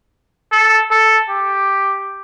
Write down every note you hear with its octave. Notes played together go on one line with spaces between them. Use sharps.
A4
A4
G4